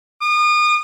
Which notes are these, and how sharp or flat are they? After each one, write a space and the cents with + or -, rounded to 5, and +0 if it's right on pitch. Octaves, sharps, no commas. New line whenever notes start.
D#6 -35